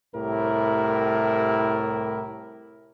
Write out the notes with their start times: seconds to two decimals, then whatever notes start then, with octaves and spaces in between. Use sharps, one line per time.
0.15 C2 A2 E4 G4 A#4